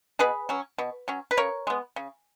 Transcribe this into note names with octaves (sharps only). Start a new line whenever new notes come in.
B2 G#4 B4
F#3 C#4
B2
F#3 C#4
B4
C#3 A#4 C#5
G#3 B3
C#3